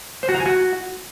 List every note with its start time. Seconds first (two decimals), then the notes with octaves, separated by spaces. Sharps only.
0.23 C5
0.29 F#4
0.34 A#5
0.40 G#5
0.46 F#4